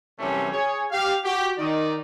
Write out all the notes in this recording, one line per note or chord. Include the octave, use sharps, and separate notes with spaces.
F#2 C3 E3 G3 A3 C#4
G#4 C#5
G4 F5
F#4 G4
D#3 D#4 D5